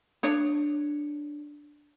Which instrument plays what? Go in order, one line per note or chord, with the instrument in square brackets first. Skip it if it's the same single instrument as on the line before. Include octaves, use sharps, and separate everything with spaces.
[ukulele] D4 C#5